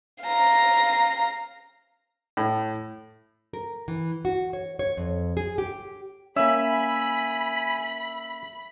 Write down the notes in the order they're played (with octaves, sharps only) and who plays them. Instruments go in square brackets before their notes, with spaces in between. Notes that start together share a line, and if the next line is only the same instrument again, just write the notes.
[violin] F5 A#5
[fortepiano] A2
[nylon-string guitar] A#4
E3
F#4
C#5
C#5
F2
G#4
G4
[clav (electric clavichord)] A#3 C#4 [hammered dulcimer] E5 [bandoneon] G#5 [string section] B5 B6